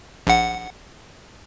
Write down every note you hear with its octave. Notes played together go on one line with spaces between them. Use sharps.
A#1 F#5